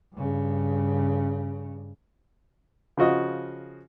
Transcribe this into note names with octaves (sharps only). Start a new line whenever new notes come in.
G2 C#3
C#3 F3 F#4 D#5